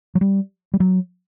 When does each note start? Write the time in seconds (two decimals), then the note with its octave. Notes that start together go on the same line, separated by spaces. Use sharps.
0.15 F#3
0.21 G3
0.74 G3
0.80 F#3